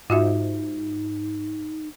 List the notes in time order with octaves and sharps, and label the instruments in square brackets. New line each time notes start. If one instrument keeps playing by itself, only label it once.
[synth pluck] G#2 [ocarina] D#4 [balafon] F4 F#4 E5